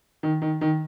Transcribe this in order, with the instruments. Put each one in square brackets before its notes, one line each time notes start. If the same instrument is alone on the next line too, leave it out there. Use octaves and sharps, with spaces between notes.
[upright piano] D#3
D#3
D#3